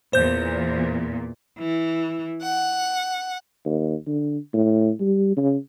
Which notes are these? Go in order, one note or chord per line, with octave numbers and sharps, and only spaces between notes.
E2 A#2 C5 G6
E3
F#5
D#2
D3
A2
G3
C#3